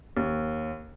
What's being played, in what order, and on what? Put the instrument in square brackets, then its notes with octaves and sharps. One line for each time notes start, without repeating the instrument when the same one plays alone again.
[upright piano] D#2